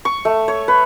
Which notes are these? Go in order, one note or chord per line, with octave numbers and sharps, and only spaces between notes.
C#6
A3
C#5
B4